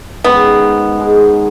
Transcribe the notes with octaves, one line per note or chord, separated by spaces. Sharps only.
G#2 D#3 G#3 B3 C#4
G#3 D#4 G#4